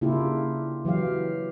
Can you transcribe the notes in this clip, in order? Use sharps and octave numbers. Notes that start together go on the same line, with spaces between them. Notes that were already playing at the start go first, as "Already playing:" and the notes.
C#3 A#3 D4 E4 F4 G4
E3 F#3 G4 F5